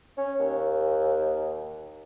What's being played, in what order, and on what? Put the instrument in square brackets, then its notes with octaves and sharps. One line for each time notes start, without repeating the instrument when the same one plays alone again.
[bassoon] C#4
D#2